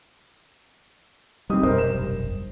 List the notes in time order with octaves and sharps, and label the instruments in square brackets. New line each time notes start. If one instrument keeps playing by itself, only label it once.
[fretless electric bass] G3 C4 [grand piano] D#4 G4 D#6
[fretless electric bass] F1 B1 G2 [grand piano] A#4 C5
[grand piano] E7